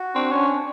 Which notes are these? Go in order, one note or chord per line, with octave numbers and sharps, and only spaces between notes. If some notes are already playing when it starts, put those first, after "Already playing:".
Already playing: F#4
C4 D4
C#4
D4